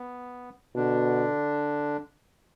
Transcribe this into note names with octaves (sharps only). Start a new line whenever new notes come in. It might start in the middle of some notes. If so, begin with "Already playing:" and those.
Already playing: B3
B2 D3 D4